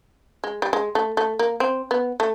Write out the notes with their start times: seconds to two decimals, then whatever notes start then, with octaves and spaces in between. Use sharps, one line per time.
0.44 G#3
0.62 G3
0.73 G#3
0.95 A3
1.17 A3
1.39 A#3
1.60 C4
1.91 B3
2.20 A3